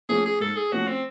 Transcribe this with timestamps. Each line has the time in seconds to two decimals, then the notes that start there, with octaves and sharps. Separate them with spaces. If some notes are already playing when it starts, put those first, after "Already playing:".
0.09 F3 A3 C#4 G#4
0.25 G#4
0.40 G#2 A4
0.56 G#4
0.72 F3 A3 C#4 F#4
0.88 C4